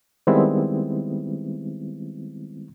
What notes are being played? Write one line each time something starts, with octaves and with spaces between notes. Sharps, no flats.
D#3 G3 G#3 B3 C4 E4